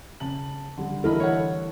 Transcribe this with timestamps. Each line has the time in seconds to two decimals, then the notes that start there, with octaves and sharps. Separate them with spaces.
0.20 C#3 A5 F#7
0.78 D3 G3
1.04 E3 E4 A4 A#4 D#5 B5
1.20 C#5 F#5